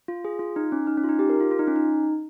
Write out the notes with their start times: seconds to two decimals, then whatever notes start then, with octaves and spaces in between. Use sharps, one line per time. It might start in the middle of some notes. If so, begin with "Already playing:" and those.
0.08 F4
0.25 G#4
0.39 F4
0.56 D#4
0.72 C#4
0.87 D#4
0.98 C#4
1.04 F4
1.09 D#4
1.19 G4
1.29 A#4
1.40 F4
1.51 F4
1.59 D#4
1.67 C#4
1.76 D#4